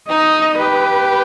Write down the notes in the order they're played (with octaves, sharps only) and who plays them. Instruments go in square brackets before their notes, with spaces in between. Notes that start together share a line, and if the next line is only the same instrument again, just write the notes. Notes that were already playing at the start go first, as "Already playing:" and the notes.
[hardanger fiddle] D#4 [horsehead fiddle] D#5
[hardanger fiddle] G4 [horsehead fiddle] B4